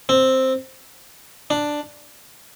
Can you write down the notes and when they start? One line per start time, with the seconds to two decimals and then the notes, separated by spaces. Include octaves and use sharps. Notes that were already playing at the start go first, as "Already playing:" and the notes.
0.09 C4
1.50 D4